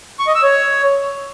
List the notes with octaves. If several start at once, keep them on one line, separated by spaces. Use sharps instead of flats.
C#6
D#5
E6
C#5